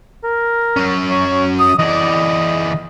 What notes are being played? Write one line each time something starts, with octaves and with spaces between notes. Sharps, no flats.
A#4
F#3 C#4
C#5
D#6
E3 D5 D#5